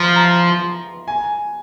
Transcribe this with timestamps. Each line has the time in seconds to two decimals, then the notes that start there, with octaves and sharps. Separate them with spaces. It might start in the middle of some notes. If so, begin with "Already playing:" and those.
Already playing: F3 A#5 C6
0.16 A#5
1.08 G#5